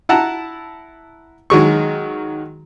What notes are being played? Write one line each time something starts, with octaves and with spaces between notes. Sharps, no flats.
E4 F#5 A5 A#5
D#3 F#3 G#3 C#6